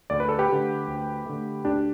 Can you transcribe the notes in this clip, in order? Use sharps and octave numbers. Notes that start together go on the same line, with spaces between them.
D2 D5
B4
A4
G4 B4
D3 A3
D2
D3 A3
D2 D4 G4